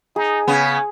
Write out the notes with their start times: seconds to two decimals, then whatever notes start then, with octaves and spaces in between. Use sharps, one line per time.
0.16 D#4 G#4
0.48 C#3 B3 G#5